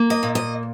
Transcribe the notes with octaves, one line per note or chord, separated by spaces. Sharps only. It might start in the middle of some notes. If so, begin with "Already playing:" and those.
Already playing: A#3
D#5
A#2
D#5